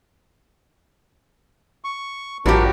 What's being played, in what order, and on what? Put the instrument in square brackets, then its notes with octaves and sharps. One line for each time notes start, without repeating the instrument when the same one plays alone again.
[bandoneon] C#6
[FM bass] A1 [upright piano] G2 F3 G3 [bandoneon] D4 A#4 [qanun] F#4 G4